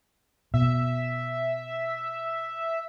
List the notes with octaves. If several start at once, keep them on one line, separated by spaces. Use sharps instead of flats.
B2 E5